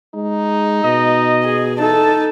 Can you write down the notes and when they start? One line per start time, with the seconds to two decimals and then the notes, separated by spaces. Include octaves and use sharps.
0.15 G#3 D#4
0.84 B2 D#5
1.43 G#4
1.78 E3 D#4 A4 A5